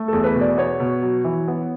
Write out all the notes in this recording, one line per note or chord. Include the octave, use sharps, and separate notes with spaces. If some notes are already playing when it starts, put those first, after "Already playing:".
Already playing: A3
E2 A4
B4
B2
D5
B3 C#5
B2
F#3
E3
B3